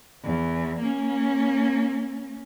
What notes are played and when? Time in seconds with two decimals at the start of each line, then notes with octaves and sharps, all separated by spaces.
0.24 E2
0.79 A#3 C#4